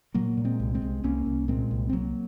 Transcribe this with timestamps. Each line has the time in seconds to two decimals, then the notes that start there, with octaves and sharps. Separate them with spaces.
0.14 A#2 F#3 A#3
0.37 A#2
0.44 G#3 C4
0.60 C2
0.74 G#3 C4
0.82 C2
1.04 C2 A#3 C#4
1.26 C2
1.48 A#2 G#3 C4
1.71 C2
1.89 C4
1.93 C2 F#3 A#3